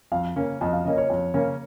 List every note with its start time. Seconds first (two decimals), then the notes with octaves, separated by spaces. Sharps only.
0.12 F2 F5
0.36 C#3 A#3 C#4
0.61 F2 D#5
0.73 F5
0.85 C#3 A#3 C#4 D#5
0.98 C#5
1.10 F2
1.34 C#3 A#3 C#4